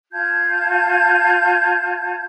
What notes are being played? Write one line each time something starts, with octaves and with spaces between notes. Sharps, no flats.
F4 A5 G6 G#6